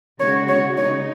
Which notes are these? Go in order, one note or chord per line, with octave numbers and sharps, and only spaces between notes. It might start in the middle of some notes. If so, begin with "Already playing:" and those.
C#3 G#3 F#4 C#5
C#5
C#3 G#3 D#4 C#5